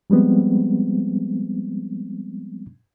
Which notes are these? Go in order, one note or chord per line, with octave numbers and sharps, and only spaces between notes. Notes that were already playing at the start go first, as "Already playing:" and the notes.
F3 G3 G#3 B3 C4